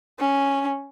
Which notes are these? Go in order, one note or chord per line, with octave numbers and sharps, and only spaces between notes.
C#4